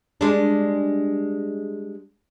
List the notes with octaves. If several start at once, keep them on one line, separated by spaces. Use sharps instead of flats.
G3 G#3 D4